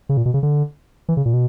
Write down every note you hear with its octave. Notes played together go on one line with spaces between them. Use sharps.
C#3
A#2
B2
C#3
D3
E3
C#3
A#2
B2